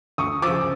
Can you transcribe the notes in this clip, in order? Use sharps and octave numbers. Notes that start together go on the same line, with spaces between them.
D2 C#6 D#6
F3 D6 E6
C#3